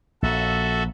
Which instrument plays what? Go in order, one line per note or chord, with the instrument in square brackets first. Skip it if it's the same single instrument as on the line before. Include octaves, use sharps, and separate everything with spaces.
[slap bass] A#1 [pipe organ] F#4 A4 E5